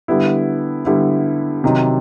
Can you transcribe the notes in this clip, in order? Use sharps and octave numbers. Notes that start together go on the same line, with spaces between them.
D3 G3 B3 E4
D3 G3 B3 E4
C3 D#3 F#3